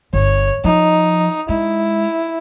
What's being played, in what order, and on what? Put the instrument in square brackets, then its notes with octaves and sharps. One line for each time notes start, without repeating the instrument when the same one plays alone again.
[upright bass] G1 [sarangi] C#5
[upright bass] F3 [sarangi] D#4
[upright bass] G#3 [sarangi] E4